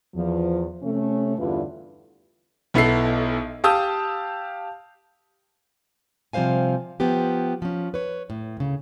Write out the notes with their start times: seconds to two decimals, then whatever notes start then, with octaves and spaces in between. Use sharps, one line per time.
0.15 E2 F3
0.83 C3 A3 C#4
1.38 E2 G2 D3 E4 F4 B4
2.74 B1 B3 E4 A4 C7
3.64 G4 F5 A5 D#6 E6 G6
6.33 C3 F3 G3 C5 F5 G#5
7.00 F3 B3 G4
7.62 F3 C#4
7.94 B4 C#5
8.30 A2
8.57 D2 C#3